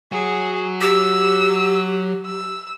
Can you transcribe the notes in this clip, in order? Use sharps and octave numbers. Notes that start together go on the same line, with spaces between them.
F#3 F#4 G#4
G4 E6
E6